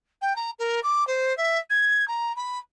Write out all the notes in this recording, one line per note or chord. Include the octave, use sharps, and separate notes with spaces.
G5
A#5
A#4
D6
C5
E5
G#6
A#5
B5